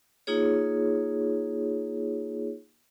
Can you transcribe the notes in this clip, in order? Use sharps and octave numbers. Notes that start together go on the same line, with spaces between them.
A#3 D#4 F4 G#4 C#5